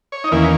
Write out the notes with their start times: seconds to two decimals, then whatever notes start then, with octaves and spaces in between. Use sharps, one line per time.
0.12 C#5
0.24 D#4
0.31 E2 D#3 A#3 C#4 E4